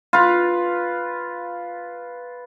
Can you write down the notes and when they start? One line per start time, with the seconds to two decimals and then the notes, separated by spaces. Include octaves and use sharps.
0.13 F4 B4